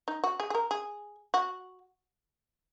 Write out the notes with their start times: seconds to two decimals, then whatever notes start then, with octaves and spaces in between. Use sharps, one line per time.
0.08 D#4
0.24 F#4
0.40 G#4
0.50 G#4
0.55 A#4
0.71 G#4
1.34 F#4